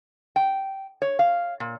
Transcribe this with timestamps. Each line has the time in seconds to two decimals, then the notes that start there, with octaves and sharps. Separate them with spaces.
0.36 G5
1.02 C#5
1.19 F5
1.60 A#2